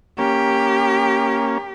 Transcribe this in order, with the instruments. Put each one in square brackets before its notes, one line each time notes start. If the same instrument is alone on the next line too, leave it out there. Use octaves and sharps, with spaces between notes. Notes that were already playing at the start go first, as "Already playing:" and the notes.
[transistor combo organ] A#3 C#4 [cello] G4